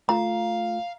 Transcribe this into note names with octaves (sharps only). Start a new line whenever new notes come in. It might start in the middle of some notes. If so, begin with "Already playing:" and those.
A3 F4 F5 A#5